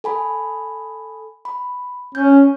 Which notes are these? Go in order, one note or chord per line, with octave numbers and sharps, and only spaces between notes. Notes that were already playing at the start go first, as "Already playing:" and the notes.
A4 G#5 B5
B5
C#4 G6